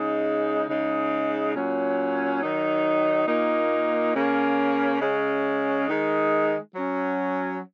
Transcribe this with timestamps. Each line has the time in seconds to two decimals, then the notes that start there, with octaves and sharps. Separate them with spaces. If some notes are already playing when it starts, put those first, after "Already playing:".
Already playing: C#3 G#3 D#4
0.68 C#3 G#3 D#4
1.55 A#2 F#3 C#4
2.42 D#3 F#3 D#4
3.27 A#2 A#3 D#4
4.15 C#3 A#3 C#4
5.01 C#3 G#3 C#4
5.87 D#3 G#3 D#4
6.74 F#3 C#4